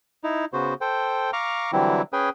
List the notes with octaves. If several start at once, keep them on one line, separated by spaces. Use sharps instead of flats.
D#4 E4
C#3 B3 F#4 C5
A4 C5 G5
F5 A#5 C#6 D6 F6
D3 E3 F#3 G3 C4 E4
C#4 G#4 B4 G5 G#5